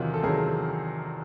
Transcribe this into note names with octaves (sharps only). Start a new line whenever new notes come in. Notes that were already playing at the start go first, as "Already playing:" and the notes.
Already playing: E2 C3 D#3 F#3 D#4 F4
A4
E2 C3 D#3 F#3 G#4 A#4